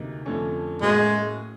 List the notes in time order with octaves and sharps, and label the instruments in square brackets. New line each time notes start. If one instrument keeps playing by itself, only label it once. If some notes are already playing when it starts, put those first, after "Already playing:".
Already playing: [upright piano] D2 C3 A#3 D#4
F2 D3 F3 A3 C#4
[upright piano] A2 F#3 A#3 C#4 F#4 [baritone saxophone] G#3